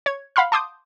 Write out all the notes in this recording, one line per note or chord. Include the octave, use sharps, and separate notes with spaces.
C#5 G#6
F5 F#5 B5 C6 F6
A5 C6 D6 D#6 G6